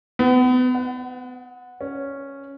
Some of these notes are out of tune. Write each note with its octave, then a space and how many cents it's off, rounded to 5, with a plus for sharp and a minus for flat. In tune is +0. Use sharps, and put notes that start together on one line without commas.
B3 +35
F#5 -10
C#4 -5